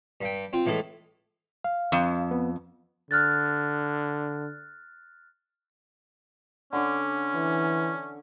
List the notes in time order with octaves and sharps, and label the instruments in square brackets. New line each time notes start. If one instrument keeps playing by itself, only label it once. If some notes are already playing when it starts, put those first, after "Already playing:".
[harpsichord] G2 G5
C4 F4
A2 E3 G#3 A4
[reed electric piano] F5
[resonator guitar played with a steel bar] F2
[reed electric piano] B3
[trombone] D3 [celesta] F6 F#6 A6
[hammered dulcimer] D3 D6 [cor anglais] C#4
[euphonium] E3